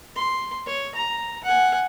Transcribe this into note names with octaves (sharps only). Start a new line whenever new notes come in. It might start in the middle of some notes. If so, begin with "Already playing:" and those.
C6
C#5
A#5
F#5 G#5